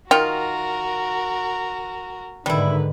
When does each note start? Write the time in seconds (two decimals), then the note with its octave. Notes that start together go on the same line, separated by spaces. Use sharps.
0.11 D#3 F4 F#4 A#4 G5
2.46 G#2 D3 D#3 G3 E4 B4